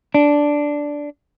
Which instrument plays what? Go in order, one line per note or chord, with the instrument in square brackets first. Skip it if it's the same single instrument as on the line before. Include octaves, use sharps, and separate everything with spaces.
[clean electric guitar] D4